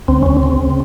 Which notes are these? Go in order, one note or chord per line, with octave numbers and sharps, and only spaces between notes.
D2 C4
D2 C#4
C4
C#3